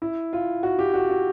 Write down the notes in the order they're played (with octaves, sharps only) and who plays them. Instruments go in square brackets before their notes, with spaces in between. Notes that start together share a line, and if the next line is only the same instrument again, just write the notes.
[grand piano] E4
F4
F#4
G4
F#4
F#4